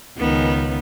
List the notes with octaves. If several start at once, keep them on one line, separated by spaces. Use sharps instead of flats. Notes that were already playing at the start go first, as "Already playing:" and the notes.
C#2 D#3 B3